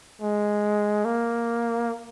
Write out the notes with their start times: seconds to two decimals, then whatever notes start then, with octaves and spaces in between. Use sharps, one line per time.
0.22 G#3
1.05 A#3